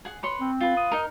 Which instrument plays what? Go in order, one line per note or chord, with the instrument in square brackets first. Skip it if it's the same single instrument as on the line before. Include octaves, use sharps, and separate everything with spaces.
[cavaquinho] G#4 F#5
B4 C#5 C6
[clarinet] C4
[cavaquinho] F4 B4
[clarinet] D#6
[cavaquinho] D#4 A#4